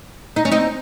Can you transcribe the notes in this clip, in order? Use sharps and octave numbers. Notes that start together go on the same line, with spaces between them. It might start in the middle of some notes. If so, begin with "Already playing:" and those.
D#4
C#4
C4 D#4